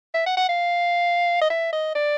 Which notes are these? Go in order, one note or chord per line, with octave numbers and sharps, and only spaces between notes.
E5
F#5
F#5
F5
D#5
E5
D#5
D5